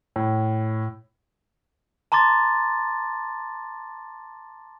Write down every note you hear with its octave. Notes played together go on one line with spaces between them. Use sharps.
A2
A5 A#5 C6 D6 A6